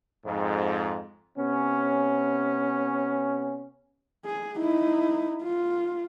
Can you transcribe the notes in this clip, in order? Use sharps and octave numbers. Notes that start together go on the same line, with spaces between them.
F2 G#2
C3 B3 C#4
G#4
D#4 E4
F4